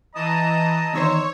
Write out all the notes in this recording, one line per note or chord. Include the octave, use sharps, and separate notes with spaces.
E3 D#5 A5 A#5 D#6
E2 D#3 C5 C#5 E6